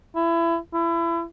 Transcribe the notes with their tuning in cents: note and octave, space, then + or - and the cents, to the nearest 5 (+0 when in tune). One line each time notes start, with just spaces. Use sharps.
E4 +25
E4 +30